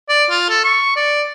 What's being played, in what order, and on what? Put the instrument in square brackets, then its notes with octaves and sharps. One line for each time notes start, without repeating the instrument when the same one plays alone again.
[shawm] D5
F4
A4
C#6
D5